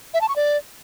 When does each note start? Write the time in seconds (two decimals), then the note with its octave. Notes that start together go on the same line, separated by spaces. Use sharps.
0.14 E5
0.21 A5
0.29 C#6
0.36 D5